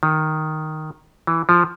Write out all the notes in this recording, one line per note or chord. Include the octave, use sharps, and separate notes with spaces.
D#3
E3
F3